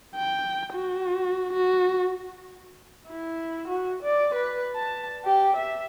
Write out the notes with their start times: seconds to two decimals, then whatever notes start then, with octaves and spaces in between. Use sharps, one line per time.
0.16 G5
0.74 F#4
1.53 F#4
3.08 E4
3.68 F#4
4.03 D5
4.35 B4
4.75 A5
5.25 G4
5.57 E5